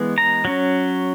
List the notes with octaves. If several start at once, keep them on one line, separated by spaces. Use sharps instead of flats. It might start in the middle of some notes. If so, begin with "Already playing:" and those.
Already playing: E3 G#3 B3
A#5
F#3 C#4